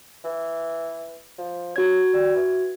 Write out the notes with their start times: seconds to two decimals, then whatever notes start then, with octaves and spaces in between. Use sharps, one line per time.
0.24 E3
1.38 F3
1.76 C#4 F#4 G#6
2.13 G3
2.35 E3